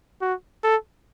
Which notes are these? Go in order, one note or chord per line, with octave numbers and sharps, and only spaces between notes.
F#4
A4